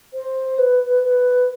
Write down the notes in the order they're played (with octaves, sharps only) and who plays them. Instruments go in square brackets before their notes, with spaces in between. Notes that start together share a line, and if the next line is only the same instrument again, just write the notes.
[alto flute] C5
B4
B4